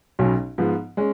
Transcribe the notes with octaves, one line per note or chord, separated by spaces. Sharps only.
B1 B2 F#3 C#4
G#2 F3 B3
G#3 C#4